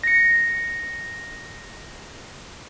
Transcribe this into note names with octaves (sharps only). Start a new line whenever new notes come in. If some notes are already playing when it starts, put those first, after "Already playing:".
A#6 C#7